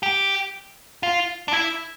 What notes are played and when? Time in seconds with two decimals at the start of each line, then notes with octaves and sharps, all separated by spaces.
0.03 G4
1.03 F4
1.48 D4
1.53 E4